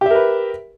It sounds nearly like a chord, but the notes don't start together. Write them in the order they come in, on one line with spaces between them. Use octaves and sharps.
G4 E5 A#4 B4